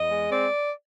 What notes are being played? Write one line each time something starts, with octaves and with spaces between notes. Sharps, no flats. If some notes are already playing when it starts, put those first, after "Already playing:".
Already playing: E2 D#5
G#3
C4 D5